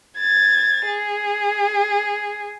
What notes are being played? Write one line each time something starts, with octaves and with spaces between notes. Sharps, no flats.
G#6 A6
G#4